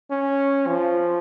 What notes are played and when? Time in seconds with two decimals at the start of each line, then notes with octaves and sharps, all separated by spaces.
0.11 C#4
0.67 F3